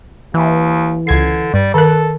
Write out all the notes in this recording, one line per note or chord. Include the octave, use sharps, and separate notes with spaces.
D#2 E3
C#2 D3 G#6 C7
G2 G3
D#3 A4 A#4